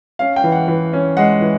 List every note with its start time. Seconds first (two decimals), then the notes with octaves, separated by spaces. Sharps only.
0.19 C#4 F5
0.36 G5
0.44 E3
0.52 F#5
0.68 E3
0.93 C#4
1.17 G#3 F#5
1.41 E3